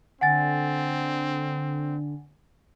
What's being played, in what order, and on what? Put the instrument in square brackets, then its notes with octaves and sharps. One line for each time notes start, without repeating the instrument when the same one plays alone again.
[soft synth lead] D3 [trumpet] C4 [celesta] F#5 G#5 A6